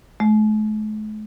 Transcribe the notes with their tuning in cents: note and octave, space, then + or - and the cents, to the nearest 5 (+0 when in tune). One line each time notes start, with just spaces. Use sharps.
A3 -45